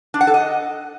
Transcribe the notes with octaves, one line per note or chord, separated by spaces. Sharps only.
D4
F#5
A4
D#5